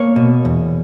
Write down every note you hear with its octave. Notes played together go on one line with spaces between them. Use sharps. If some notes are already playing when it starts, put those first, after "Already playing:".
Already playing: A#3 C#5
B2
E2